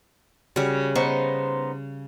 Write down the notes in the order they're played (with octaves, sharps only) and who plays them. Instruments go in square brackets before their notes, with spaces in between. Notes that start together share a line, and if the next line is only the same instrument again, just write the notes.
[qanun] C#3 G3 [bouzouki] F#4
[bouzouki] B3 D#4 C5 [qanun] C#6